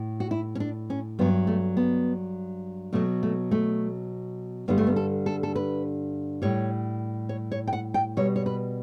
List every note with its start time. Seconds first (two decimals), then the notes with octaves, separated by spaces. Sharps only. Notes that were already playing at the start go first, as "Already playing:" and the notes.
Already playing: A2
0.20 F#4
0.31 E4
0.55 C#4
0.60 D4
0.90 C#4
1.19 G2 F#3 B3
1.47 A3
1.77 B3
2.93 B2 F#3 A3
3.23 A3
3.51 A3
4.68 G2 D3 G3 B3
4.78 A3
4.87 B3
4.96 A4
5.26 A4
5.43 A4
5.56 B4
6.42 A2 G3 C#5
7.29 C#5
7.52 C#5
7.67 G5
7.73 F#5
7.94 G5
8.17 B2 G3 C#5
8.36 C#5
8.46 B4